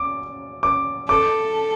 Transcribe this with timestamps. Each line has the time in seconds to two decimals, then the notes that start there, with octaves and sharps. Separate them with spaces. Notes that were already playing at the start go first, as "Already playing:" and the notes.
Already playing: D6
0.63 D6
1.09 A4 D6